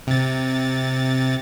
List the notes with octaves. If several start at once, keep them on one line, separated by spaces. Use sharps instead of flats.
C3 A6